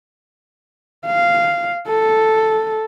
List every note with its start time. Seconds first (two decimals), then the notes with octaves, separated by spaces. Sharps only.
1.07 F5
1.88 A4